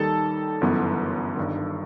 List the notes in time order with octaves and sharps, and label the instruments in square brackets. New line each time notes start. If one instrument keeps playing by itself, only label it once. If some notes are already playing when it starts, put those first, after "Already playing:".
Already playing: [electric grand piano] D#2 D#3 G3 D#4 A4 A5
G1 F#2 E3 B3
G1 G2 D#3